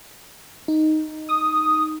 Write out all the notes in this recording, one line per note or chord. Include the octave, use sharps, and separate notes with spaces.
D#4
D#6